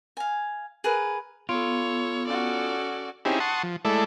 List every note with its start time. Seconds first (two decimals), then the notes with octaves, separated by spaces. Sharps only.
0.17 F5 G#5
0.84 G#4 A#4 B4
1.49 B3 F4 A4 C#5
2.26 C#4 F#4 A4 D5
3.25 C4 C#4 D#4 E4 G4 G#4
3.40 F#5 A5 C6 C#6 D#6
3.63 F3
3.85 G#3 A3 E4 A4 D5